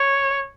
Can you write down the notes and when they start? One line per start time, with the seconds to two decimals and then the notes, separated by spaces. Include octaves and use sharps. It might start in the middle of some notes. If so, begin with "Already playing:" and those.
Already playing: C#5